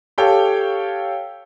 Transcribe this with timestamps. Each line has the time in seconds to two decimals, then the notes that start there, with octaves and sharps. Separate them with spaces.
0.18 G4 A4 C#5 F5 G5